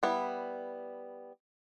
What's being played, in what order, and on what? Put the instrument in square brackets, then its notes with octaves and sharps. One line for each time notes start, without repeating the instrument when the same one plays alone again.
[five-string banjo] G3 B3 E4